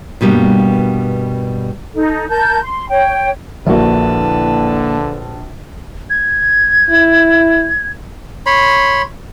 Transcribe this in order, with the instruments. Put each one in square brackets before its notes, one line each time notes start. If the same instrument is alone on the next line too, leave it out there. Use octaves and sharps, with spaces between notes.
[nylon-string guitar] G2 B2 G3 A#3
[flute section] D#4 A4
A#4 A5 G6
C6
C#5 G5
[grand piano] A#1 F#4 [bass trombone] D3 [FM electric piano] A#3 E4 [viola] B4 A5
[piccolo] G#6
[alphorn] E4
[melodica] C#5 B5 C6